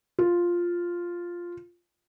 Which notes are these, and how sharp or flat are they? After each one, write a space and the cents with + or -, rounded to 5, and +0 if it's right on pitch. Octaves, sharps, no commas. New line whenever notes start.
F4 +0